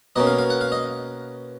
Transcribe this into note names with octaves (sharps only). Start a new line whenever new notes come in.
B2 A#3 C#4 D#5
F5
F5
F#5
F5
D#5